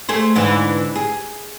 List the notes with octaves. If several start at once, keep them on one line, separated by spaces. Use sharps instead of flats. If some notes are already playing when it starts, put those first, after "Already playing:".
A3 G#4 C5
G#2 D3 E3
G#4